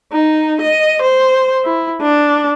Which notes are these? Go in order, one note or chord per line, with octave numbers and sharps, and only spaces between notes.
D#4
D#5
C5
E4
D4